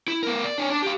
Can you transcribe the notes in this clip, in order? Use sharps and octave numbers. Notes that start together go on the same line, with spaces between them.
E4
B3 A#4
D5
D4 C#5
D4 A5
G4 F5